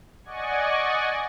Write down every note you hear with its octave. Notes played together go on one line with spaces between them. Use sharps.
D5 D#5 F#5 G#5 C#6